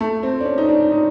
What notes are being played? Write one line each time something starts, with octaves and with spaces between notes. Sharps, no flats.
A3
C4
D4
C#4
D#4
D4
D#4